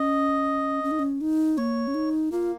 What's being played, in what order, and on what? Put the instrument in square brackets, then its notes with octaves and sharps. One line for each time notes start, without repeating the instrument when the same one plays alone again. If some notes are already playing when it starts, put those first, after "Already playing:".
Already playing: [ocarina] C#4 [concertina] D#5
[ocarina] C#4
D#4
C#4
D#4
[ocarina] A#3 [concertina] C#5
[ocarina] C#4
D#4
[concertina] A#3 [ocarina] F4